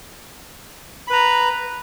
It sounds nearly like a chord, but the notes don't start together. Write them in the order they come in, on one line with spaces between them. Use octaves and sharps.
B5 B4 A#5